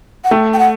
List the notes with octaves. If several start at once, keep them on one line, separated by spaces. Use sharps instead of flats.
F#5
A3 G5
G5
F#5